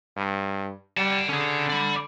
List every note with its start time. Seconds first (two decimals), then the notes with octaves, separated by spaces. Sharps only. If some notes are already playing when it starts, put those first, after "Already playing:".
0.17 G2
0.97 G3 F#5 A5
1.29 D3 C#4 G#4
1.70 D5 B5